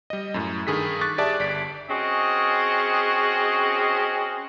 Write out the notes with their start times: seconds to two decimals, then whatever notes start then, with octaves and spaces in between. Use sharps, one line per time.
0.10 G3 D#5
0.34 F#2 A2
0.67 G2 D#3 G#4 A4 B6
1.01 C#6 D6 F#6 A6 B6
1.18 G4 G#4 D5 E5 A5
1.39 G1 D5 B6 D7
1.90 C4 C#4 F#4 G#4 D#5